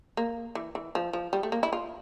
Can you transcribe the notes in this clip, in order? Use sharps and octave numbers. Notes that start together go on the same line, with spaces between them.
A#3
E3
E3
F3
F3
G3
A3
A#3
E4
F4